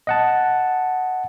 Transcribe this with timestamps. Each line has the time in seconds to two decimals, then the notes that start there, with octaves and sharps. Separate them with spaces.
0.07 D#5 F#5 A5